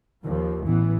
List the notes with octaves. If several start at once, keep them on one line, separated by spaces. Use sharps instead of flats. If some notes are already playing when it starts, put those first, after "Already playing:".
D#2 F3
A1 E3 B3